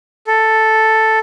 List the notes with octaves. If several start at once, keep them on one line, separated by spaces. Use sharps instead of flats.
A4